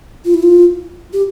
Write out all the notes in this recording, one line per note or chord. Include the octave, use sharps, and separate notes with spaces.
F4
E4
F4
G4